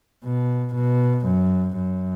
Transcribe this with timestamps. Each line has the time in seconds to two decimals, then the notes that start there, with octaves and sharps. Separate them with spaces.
0.24 B2
0.75 B2
1.27 F#2
1.78 F#2